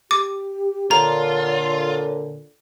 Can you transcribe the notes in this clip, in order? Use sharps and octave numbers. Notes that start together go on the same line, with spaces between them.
G4 D6
A#2 D3 F4 C#5 A#5